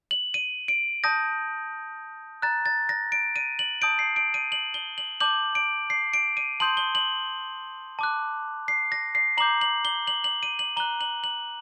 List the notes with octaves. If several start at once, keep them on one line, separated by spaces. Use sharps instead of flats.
F#7
D#7
D7
A5 D#6 G6 A#6
A#5 F#6 A6
A6
A#6
D7
D#7
F#7
A5 D#6 G6 D7
C7
D7
D#7
F#7
G7
F#7
A5 D6 G6 F#7
D7
C7
D7
D#7
A5 C6 D#6 G6 F#7
G7
F#7
A5 D6 F#6
C7
A#6
C7
A#5 D6 G6 F#7
F#7
G7
F#7
F#7
D#7
F#7
A#5 F#6 G7
F#7
F#7